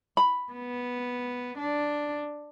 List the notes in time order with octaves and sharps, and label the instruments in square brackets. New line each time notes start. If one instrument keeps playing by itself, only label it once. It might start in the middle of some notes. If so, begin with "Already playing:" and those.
[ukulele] B5
[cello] B3
D4